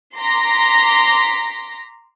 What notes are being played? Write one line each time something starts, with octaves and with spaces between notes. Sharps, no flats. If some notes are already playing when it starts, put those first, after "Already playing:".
A#5 C6 D6 A#6 B6